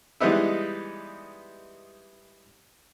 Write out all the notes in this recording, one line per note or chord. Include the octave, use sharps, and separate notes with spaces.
E3 G3 G#3 B3 D#4 E4